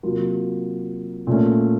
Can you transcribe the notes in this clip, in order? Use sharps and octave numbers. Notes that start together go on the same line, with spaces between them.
C3 F#3 A#3 F4
A#2 A3 C#4